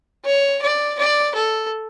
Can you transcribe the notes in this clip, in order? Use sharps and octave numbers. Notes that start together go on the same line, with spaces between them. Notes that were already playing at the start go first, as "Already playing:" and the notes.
C#5
D5
D5
A4